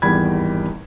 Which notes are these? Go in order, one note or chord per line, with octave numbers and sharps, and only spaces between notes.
G#1 E2 G3 B5 G#6